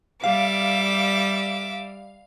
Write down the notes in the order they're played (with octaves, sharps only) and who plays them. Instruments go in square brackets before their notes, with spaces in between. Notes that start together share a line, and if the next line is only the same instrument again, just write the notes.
[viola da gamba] G3 [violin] E5 D6 [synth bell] F5